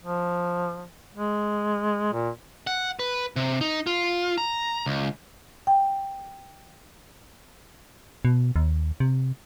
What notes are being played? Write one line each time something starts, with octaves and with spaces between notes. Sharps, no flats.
F3
G#3
A#2
F#5
B4
C3
D#4
F4
A#5
C#2
G5
B2
D#2
C3